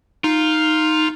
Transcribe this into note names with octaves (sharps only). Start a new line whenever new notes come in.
D#4 F4